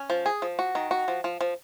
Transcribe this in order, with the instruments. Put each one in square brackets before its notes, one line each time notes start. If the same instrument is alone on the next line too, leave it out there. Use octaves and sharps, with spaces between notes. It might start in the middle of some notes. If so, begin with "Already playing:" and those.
Already playing: [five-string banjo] C#4
F3
G#4
F3
F#4
D#3
F#4
F3
F3
F3